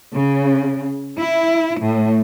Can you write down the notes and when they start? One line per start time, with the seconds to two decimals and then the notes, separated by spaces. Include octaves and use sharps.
0.14 C#3
1.18 E4
1.81 A2